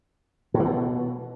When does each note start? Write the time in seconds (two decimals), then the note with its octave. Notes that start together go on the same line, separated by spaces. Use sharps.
0.54 A2
0.60 E3
0.65 B2